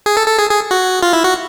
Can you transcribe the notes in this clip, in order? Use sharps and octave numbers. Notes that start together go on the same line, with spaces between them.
G#4
A4
A4
G#4
G#4
F#4
F4
E4
F#4